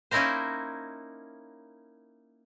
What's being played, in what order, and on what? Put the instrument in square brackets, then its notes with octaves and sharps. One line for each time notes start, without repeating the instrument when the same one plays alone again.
[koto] A#3 C#4 D#4 E4 A#4 C5